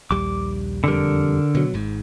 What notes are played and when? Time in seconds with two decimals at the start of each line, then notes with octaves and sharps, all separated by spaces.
0.11 A#1 D#2 G3 D6
0.84 E1 F2 D3 G3 A#4
1.55 B2 F#3
1.74 G#1 G#2